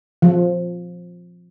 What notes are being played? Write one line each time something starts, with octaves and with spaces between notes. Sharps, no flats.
F3